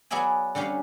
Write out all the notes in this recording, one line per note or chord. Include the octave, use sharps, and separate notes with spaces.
F#3 B3 G#4 D5 E5 G#5
D3 G3 C#4 G4 F5